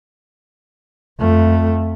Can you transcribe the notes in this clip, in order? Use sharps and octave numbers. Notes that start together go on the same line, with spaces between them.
F2 A3